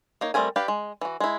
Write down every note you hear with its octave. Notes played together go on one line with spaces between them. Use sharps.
A#3 D#4 C#5
G3 A3 C4 A#4 G#5
D4 G4 B4 F5
G#3
E3 F#4
G#3 E4